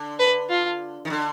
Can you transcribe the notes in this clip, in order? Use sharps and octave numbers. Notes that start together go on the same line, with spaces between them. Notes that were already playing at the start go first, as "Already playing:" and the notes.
Already playing: D3
B4
F4
D#3
D3